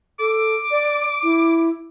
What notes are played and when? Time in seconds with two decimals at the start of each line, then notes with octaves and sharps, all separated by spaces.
0.19 A4 D6
0.71 D5
1.23 E4